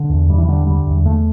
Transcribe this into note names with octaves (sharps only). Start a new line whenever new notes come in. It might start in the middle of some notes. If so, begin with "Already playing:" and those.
Already playing: D3
E2
E2 G3
E3
D3 G3
D3 G3
E2
E2 A3